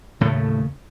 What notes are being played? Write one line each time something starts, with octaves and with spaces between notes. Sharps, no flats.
D#2 A2 C#3 A3